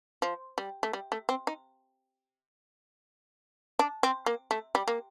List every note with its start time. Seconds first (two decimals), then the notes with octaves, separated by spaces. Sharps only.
0.22 F3
0.58 G3
0.83 A3
0.93 G3
1.12 A3
1.29 C4
1.47 D#4
3.79 D4
4.03 C4
4.26 A#3
4.51 A3
4.75 G3
4.88 A#3